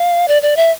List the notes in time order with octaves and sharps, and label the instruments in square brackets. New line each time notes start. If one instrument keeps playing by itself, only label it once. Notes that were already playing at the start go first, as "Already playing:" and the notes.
Already playing: [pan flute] F5
D5
D5
E5